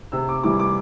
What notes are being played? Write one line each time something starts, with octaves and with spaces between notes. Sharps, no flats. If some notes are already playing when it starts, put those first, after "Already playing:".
C3 E6
D6
E3 G3 E4 D6
D6